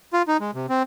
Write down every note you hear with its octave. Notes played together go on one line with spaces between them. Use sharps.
F4
D#4
G#3
C3
C4